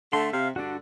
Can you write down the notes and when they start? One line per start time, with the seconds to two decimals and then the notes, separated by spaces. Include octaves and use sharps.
0.13 D3 A3 C6
0.33 C3 F5
0.56 G2 D3 D4 F#4